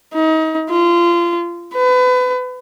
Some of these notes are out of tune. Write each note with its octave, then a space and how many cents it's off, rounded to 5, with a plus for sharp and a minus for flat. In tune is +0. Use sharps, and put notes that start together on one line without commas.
D#4 +35
F4 -25
B4 +30